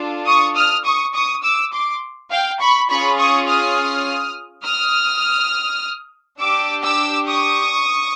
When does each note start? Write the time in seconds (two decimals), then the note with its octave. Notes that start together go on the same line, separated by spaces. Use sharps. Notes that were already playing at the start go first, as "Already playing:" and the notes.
Already playing: D4 F4 A4
0.27 C#6 D#6
0.55 D#6 F6
0.85 C#6 D#6
1.14 C#6 D#6
1.43 D6 E6
1.72 C6 D6
2.31 F5 G5
2.60 B5 C#6
2.89 C#4 F4 G#4 B5 C#6
3.18 C#6 D#6
3.48 D#6 F6
4.64 D#6 F6
6.39 D4 G4 D6 E6
6.83 D6 E6
7.27 C#6 D#6